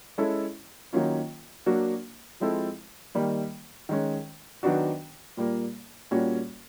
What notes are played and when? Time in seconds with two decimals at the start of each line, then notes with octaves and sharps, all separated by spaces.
0.18 G#3 C#4 E4 A4
0.93 D#3 F#3 A#3 C#4 F4
1.66 F#3 A#3 D4 F#4
2.40 F3 G#3 C4 E4 A4
3.15 D#3 G3 A#3
3.89 D#3 G#3 C#4
4.63 D#3 F#3 B3 D4 F#4
5.37 A#2 G3 A#3
6.11 A#2 G3 A#3 C#4 F#4